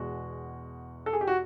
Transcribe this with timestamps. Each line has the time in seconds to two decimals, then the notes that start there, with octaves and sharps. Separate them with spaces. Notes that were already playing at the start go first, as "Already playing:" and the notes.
Already playing: E2 B2 G#3 F#4
1.06 A4
1.13 G#4
1.21 G4
1.27 F#4